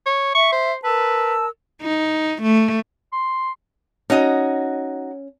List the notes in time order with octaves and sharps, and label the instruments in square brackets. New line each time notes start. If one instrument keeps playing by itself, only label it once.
[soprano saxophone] C#5
[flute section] E5 [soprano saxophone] C#6
[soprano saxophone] C5
[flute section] A#4 A5 E6 [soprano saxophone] B4
[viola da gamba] D#4
A3
[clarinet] C6
[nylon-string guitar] C#4 [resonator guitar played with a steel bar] D#4 F#4 D#5